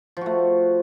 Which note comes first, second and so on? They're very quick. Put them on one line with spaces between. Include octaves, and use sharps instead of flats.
F3 F#4 A3